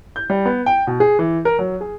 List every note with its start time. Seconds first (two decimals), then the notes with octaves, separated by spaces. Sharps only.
0.16 G6
0.30 G3
0.46 B3
0.66 G5
0.87 B2
1.00 G#4
1.19 E3
1.45 A#4
1.59 F#3
1.81 G#4